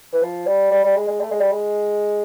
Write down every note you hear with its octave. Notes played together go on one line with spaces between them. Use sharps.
E3
F3
G3
G3
G3
G#3
G#3
A3
G#3
G3
G#3